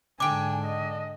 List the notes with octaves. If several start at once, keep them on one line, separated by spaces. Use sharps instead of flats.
G#2 D3 D4 G5 G#5 D6
D#5